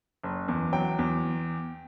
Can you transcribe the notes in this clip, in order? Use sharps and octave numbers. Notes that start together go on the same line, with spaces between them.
F#1
E2
F#3 G5
E2